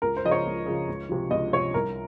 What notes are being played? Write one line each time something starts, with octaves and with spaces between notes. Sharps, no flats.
C#2 A#4
C5
C#3 F3 D#5
C#5
C#2
C#3 F3
C#2
C3 F3
C#2 D#5
C3 F3 C#5
C2 A#4